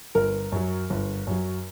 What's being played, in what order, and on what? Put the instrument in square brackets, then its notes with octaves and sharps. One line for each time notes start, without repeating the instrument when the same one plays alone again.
[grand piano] G1 A#4
F#2 F#3
G1
F#2 F#3